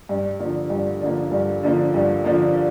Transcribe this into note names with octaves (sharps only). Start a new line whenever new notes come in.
G2
D3 F3 A#3
G2
D3 F3 A#3
G2
D3 F3 A#3
G2
D3 F3 A#3